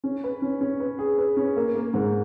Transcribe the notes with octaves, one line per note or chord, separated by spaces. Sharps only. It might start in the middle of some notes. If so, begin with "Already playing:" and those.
C#4
B4
C#4
C#4
B4
G#4
B4
C#4
A#3
A#3
G#2